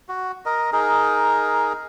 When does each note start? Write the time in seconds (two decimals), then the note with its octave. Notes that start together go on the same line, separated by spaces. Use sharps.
0.09 F#4
0.46 A#4 D#5
0.73 D#4 G#4 A#4